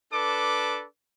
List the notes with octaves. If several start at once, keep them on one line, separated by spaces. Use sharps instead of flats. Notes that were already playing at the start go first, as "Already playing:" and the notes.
D4 A4 B4 D6